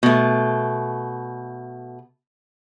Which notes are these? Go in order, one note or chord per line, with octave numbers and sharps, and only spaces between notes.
B2 A3